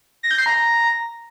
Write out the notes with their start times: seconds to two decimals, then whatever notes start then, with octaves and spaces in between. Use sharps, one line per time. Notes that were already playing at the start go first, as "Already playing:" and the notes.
0.23 A#6
0.31 G6
0.38 C7
0.46 A#5